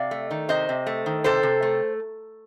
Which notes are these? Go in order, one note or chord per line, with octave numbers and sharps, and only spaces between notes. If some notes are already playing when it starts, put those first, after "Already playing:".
Already playing: C3 D5 F5
A3
D#3
C3 C5 D#5
C3
A3
D#3
C3 A4 C5
C3
A3